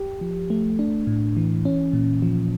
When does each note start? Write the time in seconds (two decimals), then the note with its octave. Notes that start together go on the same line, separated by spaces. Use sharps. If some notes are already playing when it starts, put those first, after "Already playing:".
Already playing: G4
0.21 F3
0.50 A3
0.79 D4
1.07 A2
1.37 E3
1.65 C#4
1.93 A#2
2.22 F3